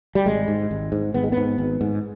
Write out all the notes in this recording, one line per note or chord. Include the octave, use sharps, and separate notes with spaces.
G3
G#1 G#3
G#2
G#1
G#2
G#1 B3
G#3
B3
G#2
G#1
G#2